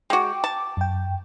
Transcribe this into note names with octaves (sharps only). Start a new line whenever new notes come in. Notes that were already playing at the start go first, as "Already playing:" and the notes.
G#3 F#4 G5 D6
A5
F#2 G5